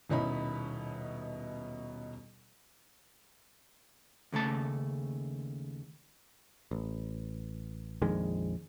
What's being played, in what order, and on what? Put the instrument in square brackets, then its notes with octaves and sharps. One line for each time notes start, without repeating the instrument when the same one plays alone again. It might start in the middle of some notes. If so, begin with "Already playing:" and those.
[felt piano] D#1 B2 C#4 D#4 E4 B5
[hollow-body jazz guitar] D#2 C#3 A3 A5
[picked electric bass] A1
A#1 F2 D#3 G#3